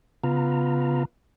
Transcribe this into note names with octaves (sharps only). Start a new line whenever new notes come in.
C#3 B3 F4 A#5